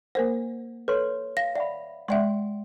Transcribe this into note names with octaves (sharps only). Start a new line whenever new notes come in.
A#3 A#4 C5 F#5
A4 B4 C#5 C6
F5 A#6
D5 E5 F#5 B5
G#3 D5 E5 F#5 G5 C6